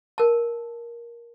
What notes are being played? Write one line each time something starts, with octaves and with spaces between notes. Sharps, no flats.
A#4 A5